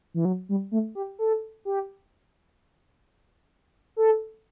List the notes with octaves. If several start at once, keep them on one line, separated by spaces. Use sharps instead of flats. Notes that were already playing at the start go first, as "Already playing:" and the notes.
E3
F#3
G3
A3
G4
A4
G4
A4